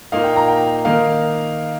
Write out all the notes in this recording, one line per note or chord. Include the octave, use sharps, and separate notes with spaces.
A#2 A#3 D#4 F5
G5
A#5
G5
D#3 A#3 D#4 F5